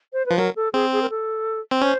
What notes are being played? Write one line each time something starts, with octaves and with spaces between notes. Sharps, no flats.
C5
F3 B4
F#3 A#4
A4
C4 G#4
G#4
A#4
A4
C4
C#4 C5